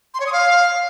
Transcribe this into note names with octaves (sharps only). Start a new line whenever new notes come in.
C6
C#5
D#6
F5